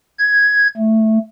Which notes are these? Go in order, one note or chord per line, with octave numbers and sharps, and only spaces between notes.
G#6
A3